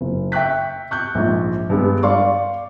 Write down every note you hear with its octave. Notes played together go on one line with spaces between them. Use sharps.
F#1
E5 G5 C#6 F#6 B6
C#6 F#6 G6
A#1 G#2
G2 G#3 B3
D5 F5 C6 C#6